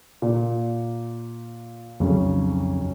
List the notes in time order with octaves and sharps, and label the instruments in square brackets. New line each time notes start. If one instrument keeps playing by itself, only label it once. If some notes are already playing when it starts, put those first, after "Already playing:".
[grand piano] A#2
[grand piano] B1 C#3 [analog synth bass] F2